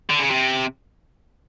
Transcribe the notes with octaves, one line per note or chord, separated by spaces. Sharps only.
D3
C#3
C3